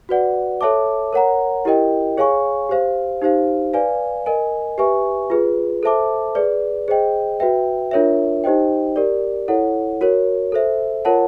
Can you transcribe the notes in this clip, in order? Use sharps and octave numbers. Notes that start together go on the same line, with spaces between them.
F#4 B4 D5 F#5
A4 C#5 E5 A5 D6
A#4 C#5 F#5 A#5
E4 G4 A#4 D#5 G5
G#4 C#5 F5 G#5 C#6
G4 C5 F5
D#4 G4 C5 F5
B4 D5 F5 G#5
A#4 D#5 G#5
G4 B4 E5 G#5 C#6
F4 G#4 B4
A4 C5 E5 A5 D6
G#4 B4 D5
G#4 C5 D#5 G5
F#4 B4 E5 G5
D4 F4 A#4 C#5 E5
D#4 G4 C5 D#5 G5
G4 A#4 D5
E4 A4 C#5 F#5
F#4 A#4 C#5
A4 C5 E5
F4 A#4 C#5 F#5 A5